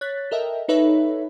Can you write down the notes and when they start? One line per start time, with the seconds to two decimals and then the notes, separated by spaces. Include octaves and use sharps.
0.01 C#5 F#6 A6 B6
0.31 A4 A#4 D#5 E5 G5
0.68 D#4 A4 B4 C#5 E5 B5